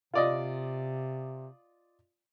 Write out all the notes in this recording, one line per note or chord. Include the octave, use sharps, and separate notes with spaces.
C3 F4 D5 D#5